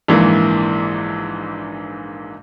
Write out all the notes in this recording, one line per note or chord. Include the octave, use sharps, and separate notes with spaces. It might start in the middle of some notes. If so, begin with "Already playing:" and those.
A#1 G#2 E3 A#3